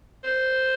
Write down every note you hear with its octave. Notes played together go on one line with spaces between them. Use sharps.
C5